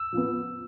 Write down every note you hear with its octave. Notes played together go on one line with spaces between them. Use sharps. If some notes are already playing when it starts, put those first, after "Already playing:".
Already playing: E6
F3 B3